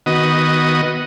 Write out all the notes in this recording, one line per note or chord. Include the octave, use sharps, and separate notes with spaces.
D#3 B3 F#4 D#5